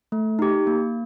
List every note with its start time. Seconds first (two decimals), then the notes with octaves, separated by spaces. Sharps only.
0.12 A3
0.39 D#4 G4
0.67 A#3